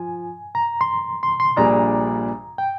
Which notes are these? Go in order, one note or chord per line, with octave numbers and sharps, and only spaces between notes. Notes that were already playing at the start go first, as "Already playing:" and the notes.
Already playing: F3 G#5
A#5
C6
C6
C6
A#1 A#2 G3 D4 G#4 A#5
G5